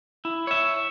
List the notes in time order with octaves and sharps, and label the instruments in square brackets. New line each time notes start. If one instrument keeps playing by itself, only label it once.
[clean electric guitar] E4
C#5 E5